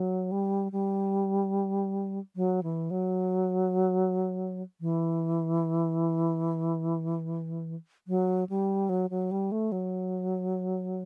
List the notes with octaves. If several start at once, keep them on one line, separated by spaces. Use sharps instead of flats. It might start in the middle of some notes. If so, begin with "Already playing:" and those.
Already playing: F#3
G3
G3
F#3
E3
F#3
E3
F#3
G3
F#3
F#3
G3
A3
F#3